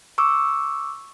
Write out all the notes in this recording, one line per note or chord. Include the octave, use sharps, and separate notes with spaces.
C#6 D6 E6